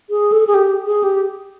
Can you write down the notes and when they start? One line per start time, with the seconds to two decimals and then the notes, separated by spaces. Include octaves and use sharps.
0.10 G#4
0.32 A4
0.47 G#4
0.54 G4
0.86 G#4
1.03 G4